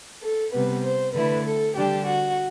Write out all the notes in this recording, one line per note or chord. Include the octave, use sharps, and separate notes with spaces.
A4
C3 G3 B3 B4
C5
D3 A3 E4 B4
A4
D3 G3 D4 G4
F#4